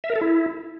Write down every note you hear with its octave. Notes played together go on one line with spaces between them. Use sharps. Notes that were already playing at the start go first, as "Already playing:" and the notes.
E5
A#4
A4
E4